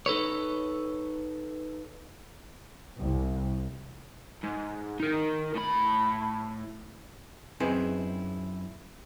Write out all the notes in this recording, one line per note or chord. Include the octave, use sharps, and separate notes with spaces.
D#4 A4 B4 C#5
C2
G#2
D#4 A#4
A2 B5
F#2 C4 D#4 E4 G#4 B4